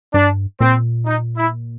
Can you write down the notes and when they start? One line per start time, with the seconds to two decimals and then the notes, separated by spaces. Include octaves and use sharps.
0.14 G2 D4
0.60 A#2 C4
1.06 D#4
1.37 E4